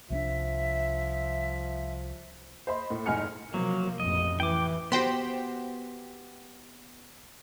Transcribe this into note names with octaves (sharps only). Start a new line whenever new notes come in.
C2 F3 G#3 D4 E5
C5 D#5 B5
A2
F1 G#2 G#5 F6 C#7
C3 F3 F#3 A#3
A1 F2 D#5
E3 G5 D6
B3 F#4 G4 C5 G5 C6